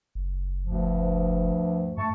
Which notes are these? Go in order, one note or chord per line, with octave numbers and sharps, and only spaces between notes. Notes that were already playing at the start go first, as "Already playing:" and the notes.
F#1
D2 G2 F3
G2 A3 A5 C#6